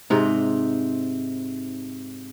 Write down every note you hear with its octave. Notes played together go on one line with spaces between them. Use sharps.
G#2 C3 D#4